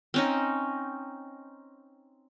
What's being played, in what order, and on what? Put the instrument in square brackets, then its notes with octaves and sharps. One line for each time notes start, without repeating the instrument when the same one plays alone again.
[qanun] C4 C#4 D#4